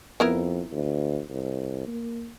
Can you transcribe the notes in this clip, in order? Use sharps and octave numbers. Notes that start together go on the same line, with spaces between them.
F2 B3 E4 A#4
D2
C2
A#3